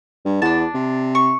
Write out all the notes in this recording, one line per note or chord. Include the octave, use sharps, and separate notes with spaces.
G2
E2 D4 A5
C3
C#6